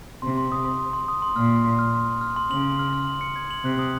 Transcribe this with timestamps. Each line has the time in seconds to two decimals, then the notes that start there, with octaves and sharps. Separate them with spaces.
0.22 C3 C6
0.38 C6
0.52 D#6
0.65 C6
0.79 C6
0.93 C6
1.08 D#6
1.22 C6
1.36 A#2 F6
1.50 C6
1.64 C6
1.79 F6
1.94 C6
2.08 C6
2.21 F6
2.36 C6
2.50 C#3 F#7
2.65 F#7
2.79 F6
2.93 F6
3.07 F#7
3.21 C#7
3.36 G#6
3.51 F#7
3.64 C3 F#6
3.79 D#6